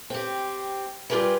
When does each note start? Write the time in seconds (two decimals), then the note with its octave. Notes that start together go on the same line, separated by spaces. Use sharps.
0.10 C4 G4
1.10 G3 F4 G4 G#4 A#4 B4